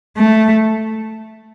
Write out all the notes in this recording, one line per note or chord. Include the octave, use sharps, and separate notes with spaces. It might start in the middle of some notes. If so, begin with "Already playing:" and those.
A3